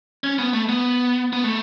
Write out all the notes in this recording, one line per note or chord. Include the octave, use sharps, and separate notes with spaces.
C#4
B3
A3
B3
B3
A3